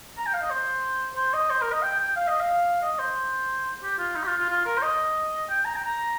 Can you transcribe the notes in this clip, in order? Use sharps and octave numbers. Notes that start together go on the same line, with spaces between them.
A#5
G5
F5
D#5
C5
C5
D#5
C5
A#4
D#5
G5
G5
F5
D#5
F5
D#5
C5
G4
F4
D#4
G4
F4
F4
F4
A#4
C5
D#5
G5
A#5
G5
A#5